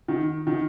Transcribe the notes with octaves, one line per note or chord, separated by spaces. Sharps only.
D#3
D#3